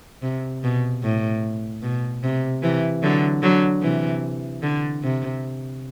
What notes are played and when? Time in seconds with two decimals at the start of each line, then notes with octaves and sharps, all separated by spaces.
0.22 C3
0.63 B2
1.03 A2
1.82 B2
2.23 C3
2.63 C3 E3
3.03 D3 F#3
3.42 D3 F#3
3.82 C3 E3
4.63 D3
5.03 C3